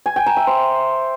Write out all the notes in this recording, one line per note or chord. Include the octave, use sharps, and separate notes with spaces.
G#5
G5
A#5
E5
C5